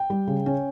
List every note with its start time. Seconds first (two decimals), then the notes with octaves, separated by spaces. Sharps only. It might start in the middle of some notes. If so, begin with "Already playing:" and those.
Already playing: G5
0.10 G3
0.27 C#3
0.46 C#4